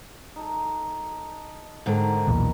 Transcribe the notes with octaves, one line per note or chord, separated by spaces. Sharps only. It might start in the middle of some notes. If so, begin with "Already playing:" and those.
D#4 A4
G#2 D3 D#3 A5
B1 E2 A#2 B4